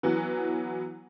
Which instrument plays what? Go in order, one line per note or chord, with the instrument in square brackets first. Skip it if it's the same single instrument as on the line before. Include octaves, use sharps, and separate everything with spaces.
[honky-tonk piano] E3 F#3 B3